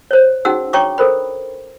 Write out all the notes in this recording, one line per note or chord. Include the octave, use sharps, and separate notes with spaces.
C5 C#5
C#4 D#4 F#4 G#4 F#5 E6
D4 C#5 G5 A#5 C#6 D6
A4 A#4 C5 B5